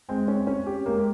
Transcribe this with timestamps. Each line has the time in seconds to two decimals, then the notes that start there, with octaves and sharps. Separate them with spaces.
0.09 G#3 C4
0.28 C4 C#4
0.47 C#4 C#5
0.66 G4
0.86 G#3 A#3